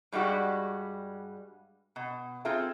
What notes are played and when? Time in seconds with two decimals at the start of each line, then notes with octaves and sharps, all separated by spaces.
0.12 G2 G3 G#3 F#4 G4
1.96 B2
2.45 C4 F4 G#4 A4 E5